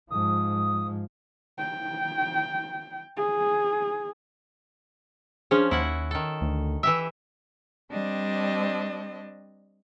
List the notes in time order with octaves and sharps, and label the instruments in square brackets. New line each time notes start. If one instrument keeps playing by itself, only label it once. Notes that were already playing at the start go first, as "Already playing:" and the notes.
[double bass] G#2 F3 [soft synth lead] D#6
[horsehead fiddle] G5
G#4
[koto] F3 C#4 [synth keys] D4 G#4
[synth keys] D#2 [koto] E4 F#4 F#5
[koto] D#3 A4
[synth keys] D2
[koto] E3 G4 E5 [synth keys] E6
[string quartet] G3 C4 D4 D#5